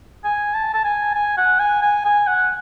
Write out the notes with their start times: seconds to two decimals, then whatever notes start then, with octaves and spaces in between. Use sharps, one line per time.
0.24 G#5
0.54 A5
0.74 A5
0.84 G#5
1.14 G#5
1.38 F#5
1.60 G#5
1.82 G#5
2.05 G#5
2.27 F#5